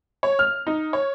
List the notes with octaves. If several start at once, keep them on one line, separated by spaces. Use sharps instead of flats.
C#5
F6
D#4
C#5